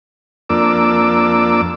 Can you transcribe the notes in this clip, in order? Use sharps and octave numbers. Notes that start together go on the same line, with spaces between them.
F2 A#3 D4 D6 E6